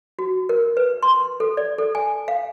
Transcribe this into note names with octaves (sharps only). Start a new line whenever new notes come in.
F#4
A#4
B4
C6
A4
D5
A4
G#5
F5